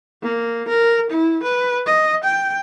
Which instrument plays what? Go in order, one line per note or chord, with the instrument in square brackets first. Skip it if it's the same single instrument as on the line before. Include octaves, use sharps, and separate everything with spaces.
[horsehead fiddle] A#3
A#4
E4
B4
D#5
G5